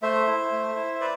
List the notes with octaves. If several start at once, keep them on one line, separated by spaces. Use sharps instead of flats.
A3 C5 E5
E4
A3
E4
B4 D5